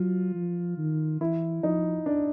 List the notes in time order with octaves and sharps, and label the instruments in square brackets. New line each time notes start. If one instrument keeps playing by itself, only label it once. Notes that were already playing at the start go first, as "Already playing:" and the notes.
Already playing: [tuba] F#3 [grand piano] F4
[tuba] F3
D#3
[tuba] E3 [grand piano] E4
[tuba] F3 [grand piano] D#4
[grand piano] D4